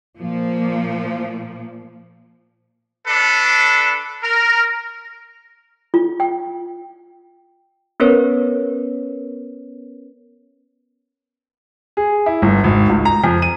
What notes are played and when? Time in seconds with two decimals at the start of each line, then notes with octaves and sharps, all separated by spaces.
0.18 A#2 F3 A#3
3.07 D4 A4 B4
4.24 A#4
5.94 F4
6.20 G5
8.00 B3 C#4 A#4 B4 C#5
11.97 G#4
12.26 E4
12.42 G1
12.64 G#1
12.90 C#2
13.05 A#5
13.24 F2
13.42 D#7